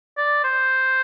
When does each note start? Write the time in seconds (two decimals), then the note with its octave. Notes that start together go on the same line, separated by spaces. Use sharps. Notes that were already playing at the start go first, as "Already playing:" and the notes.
0.17 D5
0.44 C5